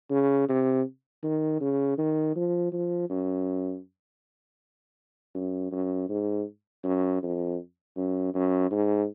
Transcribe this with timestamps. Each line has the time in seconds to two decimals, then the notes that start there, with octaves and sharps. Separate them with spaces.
0.10 C#3
0.49 C3
1.23 D#3
1.60 C#3
1.98 D#3
2.35 F3
2.72 F3
3.10 F#2
5.35 F#2
5.72 F#2
6.09 G#2
6.84 F#2
7.22 F2
7.97 F#2
8.34 F#2
8.71 G#2